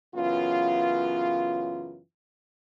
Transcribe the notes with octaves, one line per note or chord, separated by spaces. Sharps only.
F#2 C#3 E3 B3 F4